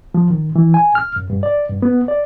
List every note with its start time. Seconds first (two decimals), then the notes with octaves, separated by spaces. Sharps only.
0.14 F3
0.30 D#3
0.56 E3
0.74 G#5
0.95 F6
1.16 F#2
1.30 G2
1.43 D5
1.69 G2
1.82 B3
2.08 D5